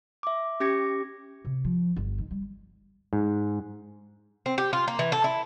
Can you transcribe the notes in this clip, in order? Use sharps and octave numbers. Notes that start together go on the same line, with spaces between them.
E5 D6
C#4 G4 D6 G#6 A#6 C#7
C3
F3
G1
D#3
G3
G#2
C4
G4
F4
A#3
E3
A4
E4